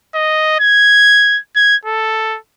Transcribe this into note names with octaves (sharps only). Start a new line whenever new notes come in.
D#5
G#6
G#6
A4